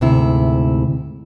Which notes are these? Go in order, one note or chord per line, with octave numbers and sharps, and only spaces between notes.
D2 G#2 C3 E4